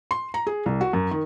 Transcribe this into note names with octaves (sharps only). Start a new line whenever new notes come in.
C6
A#5
G#4
C2
F#4
F#2
D#3